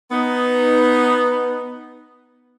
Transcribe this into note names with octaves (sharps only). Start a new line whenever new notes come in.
B3 D#4